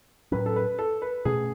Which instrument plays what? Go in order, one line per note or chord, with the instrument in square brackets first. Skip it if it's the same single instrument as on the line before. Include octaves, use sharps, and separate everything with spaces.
[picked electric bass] A2 F#3 C#4 [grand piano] B4
[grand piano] A4
B4
A4
B4
[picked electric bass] B2 A3 C#4 [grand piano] G#4